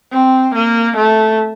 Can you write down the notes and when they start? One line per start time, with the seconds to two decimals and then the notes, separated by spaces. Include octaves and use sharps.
0.12 C4
0.54 A#3
0.96 A3